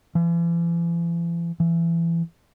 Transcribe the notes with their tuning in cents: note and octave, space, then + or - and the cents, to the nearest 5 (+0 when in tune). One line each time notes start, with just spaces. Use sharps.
E3 +45
E3 +25